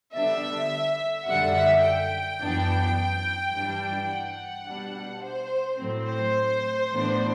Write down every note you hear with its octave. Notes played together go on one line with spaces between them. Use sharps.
D3 G3 B3 D4 E5
F#2 D3 G3 F#5
E5
G5
F#2 E3 B3 D4
G2 E3 G3 D4
F#5
B2 G3 D4
C5
A2 F#3 C4
C5
A2 E3 B3 D4